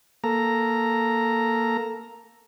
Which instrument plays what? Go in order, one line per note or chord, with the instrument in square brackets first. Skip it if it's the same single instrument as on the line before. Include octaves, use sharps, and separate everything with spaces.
[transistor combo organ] A#3 A4 A#5